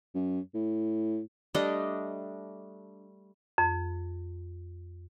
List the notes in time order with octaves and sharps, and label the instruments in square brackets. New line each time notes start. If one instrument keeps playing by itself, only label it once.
[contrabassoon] F#2
A2
[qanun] G3 A3 D4 D#5
[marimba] F2